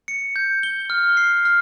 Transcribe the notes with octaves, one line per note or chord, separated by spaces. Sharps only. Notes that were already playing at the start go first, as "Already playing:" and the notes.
C#7
G6
G7
F6
C7
F6